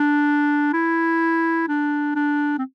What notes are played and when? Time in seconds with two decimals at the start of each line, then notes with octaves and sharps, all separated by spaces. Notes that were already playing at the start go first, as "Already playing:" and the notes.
Already playing: D4
0.73 E4
1.68 D4
2.15 D4
2.58 C4